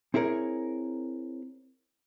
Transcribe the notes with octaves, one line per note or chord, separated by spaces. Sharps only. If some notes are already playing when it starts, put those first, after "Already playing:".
C4 E4 G#4 A#4 C#5